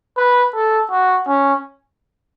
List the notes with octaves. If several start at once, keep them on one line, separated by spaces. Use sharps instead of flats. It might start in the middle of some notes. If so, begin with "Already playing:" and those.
B4
A4
F#4
C#4